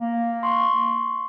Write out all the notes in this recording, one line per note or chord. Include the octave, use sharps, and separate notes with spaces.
A#3
C6 C#6